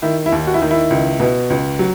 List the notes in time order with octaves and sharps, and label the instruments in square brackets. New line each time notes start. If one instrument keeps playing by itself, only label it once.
[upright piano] D#3 E4
E4
D#2
F#4
E4
D#3
E4
C#2
B2
C#2
F#3